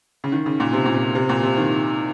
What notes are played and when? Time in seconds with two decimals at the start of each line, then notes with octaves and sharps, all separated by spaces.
0.24 C#3
0.32 D#3
0.46 C#3
0.60 A#2
0.73 C3
0.86 A#2
0.94 C3
1.15 C3
1.29 A#2
1.43 C3
1.57 D#3